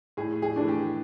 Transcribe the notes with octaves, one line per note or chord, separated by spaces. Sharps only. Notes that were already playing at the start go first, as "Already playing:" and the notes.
A2 G#4
G#4
E3 A3 D4
G4